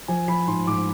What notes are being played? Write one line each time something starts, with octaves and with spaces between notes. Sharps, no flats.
F3 G#5
F3 B5
G#2 C6
G#2 D6